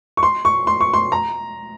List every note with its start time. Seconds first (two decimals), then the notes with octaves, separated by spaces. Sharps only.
0.17 C#6
0.23 C6
0.45 C#6
0.67 C6
0.81 C#6
0.94 C6
1.12 A#5